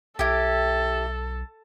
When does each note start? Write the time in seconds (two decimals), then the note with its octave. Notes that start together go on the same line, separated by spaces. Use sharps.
0.19 B1 E4 G4 A4